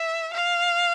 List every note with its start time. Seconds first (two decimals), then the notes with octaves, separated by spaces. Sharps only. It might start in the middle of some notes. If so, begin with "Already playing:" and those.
Already playing: E5
0.34 F5